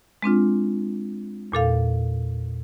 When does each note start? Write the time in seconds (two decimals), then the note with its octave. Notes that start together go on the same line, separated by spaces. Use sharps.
0.22 G#3 C4 D4 F4
1.52 E2 A#2 A4 F5